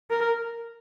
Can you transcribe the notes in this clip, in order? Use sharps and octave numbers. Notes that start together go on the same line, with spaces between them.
A#4